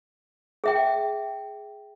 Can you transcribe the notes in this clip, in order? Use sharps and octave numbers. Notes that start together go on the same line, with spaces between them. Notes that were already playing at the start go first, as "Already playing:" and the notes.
G#4 E5 G5